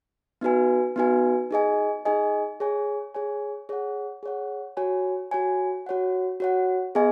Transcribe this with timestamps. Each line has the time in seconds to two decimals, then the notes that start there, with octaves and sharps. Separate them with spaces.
0.41 B3 D#4 F#4 B4 G#5
0.96 B3 D#4 F#4 B4 G#5
1.51 D#4 G#4 D#5 G#5
2.05 D#4 G#4 D#5 G#5
2.60 G#4 C#5 G#5
3.15 G#4 C#5 G#5
3.69 G#4 C#5 F#5
4.23 G#4 C#5 F#5
4.77 F#4 C#5 G#5
5.31 F#4 C#5 G#5
5.86 F#4 C#5 F#5
6.40 F#4 C#5 F#5
6.95 B3 G#4 D#5 G#5